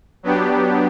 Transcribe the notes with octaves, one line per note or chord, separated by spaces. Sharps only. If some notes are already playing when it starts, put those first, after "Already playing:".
F#3 B3 D4 G4